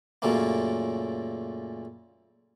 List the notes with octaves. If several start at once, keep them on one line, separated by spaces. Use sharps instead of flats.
F#2 A#2 C#3 A3 A#3